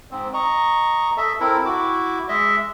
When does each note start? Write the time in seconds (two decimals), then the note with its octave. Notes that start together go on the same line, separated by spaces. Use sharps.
0.11 G#2 C4
0.34 D#5 A#5 C#6
1.17 A4 D#5 E5
1.40 C4 E4 A4 A#4
1.65 E4 F#4 D6
2.29 G#3 D#5 E5